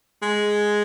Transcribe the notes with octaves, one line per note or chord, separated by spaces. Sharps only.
G#3